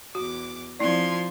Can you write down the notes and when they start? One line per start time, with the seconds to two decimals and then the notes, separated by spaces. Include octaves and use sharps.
0.15 E2 F#4 D6
0.79 F3 C4 E4 D5 C6 G#6